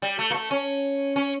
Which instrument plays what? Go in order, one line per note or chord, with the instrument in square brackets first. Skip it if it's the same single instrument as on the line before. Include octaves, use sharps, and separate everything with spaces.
[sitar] G3
A3
A#3
A3
C#4
C#4